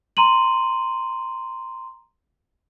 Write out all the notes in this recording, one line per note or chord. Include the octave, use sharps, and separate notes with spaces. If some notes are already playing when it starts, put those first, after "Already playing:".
A#5 C6 D#7 F#7